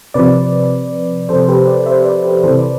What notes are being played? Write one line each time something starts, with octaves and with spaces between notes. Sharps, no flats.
C3 F3 B4 D5
C3 F3 A4 C5
G4 B4
B4 D5
C5 E5
B4 D5
G4 B4
C3 E3 A4 C5
B4 D5